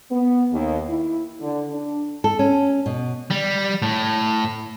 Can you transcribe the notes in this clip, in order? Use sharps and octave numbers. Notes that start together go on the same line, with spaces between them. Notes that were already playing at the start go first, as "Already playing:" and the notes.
B3
D#2
E4
D3
D4
A4
C#4
B2
G3
A2